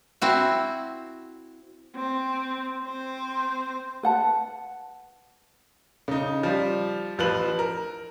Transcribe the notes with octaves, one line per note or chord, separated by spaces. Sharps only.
C4 E4 F#4
C4
C4 C5
B4 F#5 A5
C#3 D#4
F3 G3
A1 F3 B4 F#7
A#4